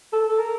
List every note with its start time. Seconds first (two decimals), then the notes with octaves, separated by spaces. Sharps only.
0.13 A4
0.28 A4
0.39 A#4